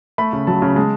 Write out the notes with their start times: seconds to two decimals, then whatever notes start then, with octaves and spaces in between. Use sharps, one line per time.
0.18 A3 B5
0.33 C#3
0.47 F#3 A5
0.62 C#3
0.76 G#3 A5